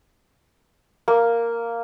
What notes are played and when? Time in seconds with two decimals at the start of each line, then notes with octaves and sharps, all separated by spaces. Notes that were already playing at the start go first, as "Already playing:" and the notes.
1.08 A#3